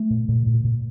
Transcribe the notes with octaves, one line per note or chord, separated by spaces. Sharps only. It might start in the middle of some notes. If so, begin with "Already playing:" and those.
Already playing: A3
A#2
A#2
A#2
A#2